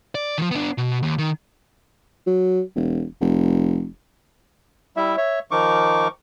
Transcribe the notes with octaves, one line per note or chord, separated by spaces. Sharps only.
D5
D#3 F3
B3 D4
B2
D#2
D#3
F#3
E1
F1
G3 E4 E5
C#5 E5
D#3 F3 D#4 C#6 D6